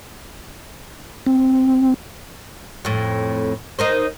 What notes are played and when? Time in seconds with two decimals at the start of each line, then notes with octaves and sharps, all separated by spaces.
1.26 C4
2.85 F2 A2
3.79 D#4 A#4 C5